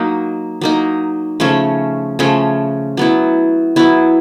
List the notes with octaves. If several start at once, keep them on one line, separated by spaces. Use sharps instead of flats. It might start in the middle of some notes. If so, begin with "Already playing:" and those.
Already playing: F#3 A#3 D#4
F#3 A#3 D#4
C#3 F3 A3 C#4
C#3 F3 A3 C#4
F#3 B3 E4
F#3 B3 E4